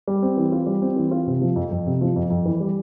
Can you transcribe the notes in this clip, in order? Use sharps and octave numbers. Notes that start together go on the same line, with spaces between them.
G3
C4
E3
F4
G3
C4
E3
F4
C3
F3
F2
F2
C3
F3
F2
F2
E3
G3